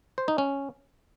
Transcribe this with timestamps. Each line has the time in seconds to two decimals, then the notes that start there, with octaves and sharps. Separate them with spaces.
0.18 C5
0.28 D#4
0.38 C#4